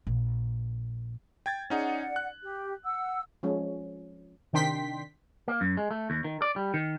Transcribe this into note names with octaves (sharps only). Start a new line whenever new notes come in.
A#1
G5 G#6 A6
C#4 D#4 G#4 D5 F#5
F#6
G4
F#5 E6
F3 G#3 C#4
C3 D#3 D4 G5 C6 B6
A#3
F#2
G#3
A3
D#2
D#3
D5
G3
D#3